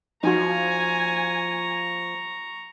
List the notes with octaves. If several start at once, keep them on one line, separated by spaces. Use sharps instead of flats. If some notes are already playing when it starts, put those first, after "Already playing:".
F3 D#4 F#4 G#5 A#5 C#6